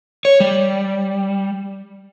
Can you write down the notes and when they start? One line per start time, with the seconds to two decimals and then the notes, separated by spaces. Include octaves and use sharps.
0.25 C#5
0.40 G3